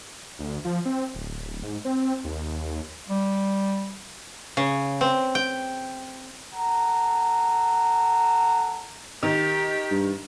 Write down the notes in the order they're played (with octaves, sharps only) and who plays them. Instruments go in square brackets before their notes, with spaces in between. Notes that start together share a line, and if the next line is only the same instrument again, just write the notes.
[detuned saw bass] D2
F3
C4
D1
G#2
C4
D#2
[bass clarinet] G3
[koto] C#3
C4
G5
[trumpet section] A4 F#5 A#5
[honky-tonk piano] D#3 [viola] G4
[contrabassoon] G2